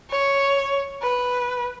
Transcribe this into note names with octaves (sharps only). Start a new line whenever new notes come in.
C#5
B4